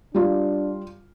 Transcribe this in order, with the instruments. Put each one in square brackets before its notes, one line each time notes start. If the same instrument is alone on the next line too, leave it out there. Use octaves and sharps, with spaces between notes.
[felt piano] G3 F4 [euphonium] D4